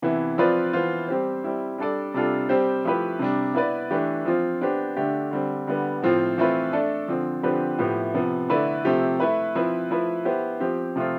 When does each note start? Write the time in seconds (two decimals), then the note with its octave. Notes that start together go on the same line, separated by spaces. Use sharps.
0.02 C3 E3 B3 E4
0.38 F3 C4 F4 B4 D5
0.73 E3 B3 F4 C5
1.08 G3 C4 G4 C5
1.44 G3 C4 E4
1.78 G3 D4 A4 D5
2.14 C3 G3 D4 F4 A4
2.49 G3 C4 G4 C5
2.85 F3 A3 E4 G4 B4
3.19 C3 G3 D4
3.55 B3 E4 B4 D5
3.91 E3 A3 D4 G4 B4
4.26 F3 C4 F4
4.61 B3 D4 G4 C5
4.97 D3 A3 D4 G4
5.31 D3 G3 C4
5.67 D3 G3 B3
6.02 A2 F3 C4 F4 C5
6.38 E3 A3 C4 F4 B4
6.73 A3 D4 A4 D5
7.08 D3 F3 C4
7.43 D3 F3 C4 G4 B4
7.78 A2 F3 B3 E4 G4
8.14 C3 F3 B3
8.49 D3 A3 E4 B4 D5
8.85 C3 F3 A3 C4 G4
9.20 A3 E4 B4
9.55 F3 C4 E4 B4
9.91 F3 A3 E4 B4
10.25 B3 E4 G4 C5
10.60 F3 C4 G4
10.96 C3 F3 A3 C4 F4